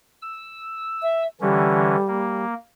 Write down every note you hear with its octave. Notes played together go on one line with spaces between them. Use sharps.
E6
E5
D3 E3 G3 C#4
A#3